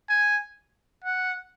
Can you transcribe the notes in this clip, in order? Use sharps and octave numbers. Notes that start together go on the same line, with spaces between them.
G#5
F#5